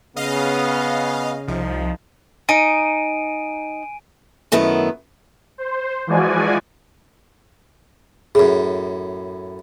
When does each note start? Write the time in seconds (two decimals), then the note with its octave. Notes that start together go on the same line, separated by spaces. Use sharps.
0.16 C#3 B3 D#5 F5
1.47 C2 F3 D#4
2.49 D#4 G#5 D7 D#7
4.52 F#2 D#3 A3 B3 E4
5.58 C5
6.07 E3 F3 G#3 F#4 D5 G#5
8.35 F#2 A2 G#4